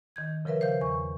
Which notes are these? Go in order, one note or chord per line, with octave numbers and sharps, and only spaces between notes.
D#3 G6 G#6
C#3 F3 A#4 B4 E5
C5 F5 G6
E2 C#6